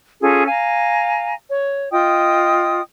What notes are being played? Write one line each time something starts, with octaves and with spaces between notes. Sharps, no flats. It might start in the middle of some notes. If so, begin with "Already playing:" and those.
C#4 F4 G#4 A4
F5 G#5 A#5
C#5
F4 D#5 G5 D#6